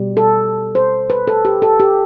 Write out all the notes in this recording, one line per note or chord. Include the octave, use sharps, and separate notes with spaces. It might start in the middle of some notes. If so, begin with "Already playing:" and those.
Already playing: B2 G3
A4
C5
B4
A4
G4
A4
G4